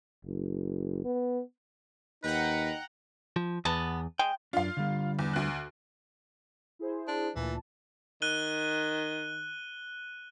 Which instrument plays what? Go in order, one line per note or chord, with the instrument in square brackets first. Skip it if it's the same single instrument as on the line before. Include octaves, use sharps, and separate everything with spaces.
[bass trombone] F#1
B3
[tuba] D#2 [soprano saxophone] D#4 [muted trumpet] B4 [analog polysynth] F#5 G5 A#5
[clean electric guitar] F3
[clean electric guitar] E2 [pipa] B3 A5
[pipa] G#3 [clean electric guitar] G5
[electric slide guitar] F#2 D4 [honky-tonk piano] F4 F5
[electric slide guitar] D3 G3
[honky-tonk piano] E2
D2 F#6
[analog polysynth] E4 G#4 C5
[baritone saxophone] D4
[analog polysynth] D2 A#2 A5 [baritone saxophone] E3
[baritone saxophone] D#3 [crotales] F#6 D#7 G7